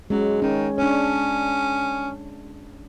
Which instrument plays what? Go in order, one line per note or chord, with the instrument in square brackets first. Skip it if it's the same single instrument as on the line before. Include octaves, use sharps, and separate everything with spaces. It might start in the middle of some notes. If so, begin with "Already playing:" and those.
[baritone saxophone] F#3 [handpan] G#3 C#4
[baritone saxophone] D#3 [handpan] C#4
[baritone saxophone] C#4 [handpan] D4 C#5